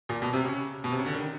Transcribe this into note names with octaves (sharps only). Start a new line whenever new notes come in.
A#2
B2
C3
C#3
B2
C3
C#3
D3
D#3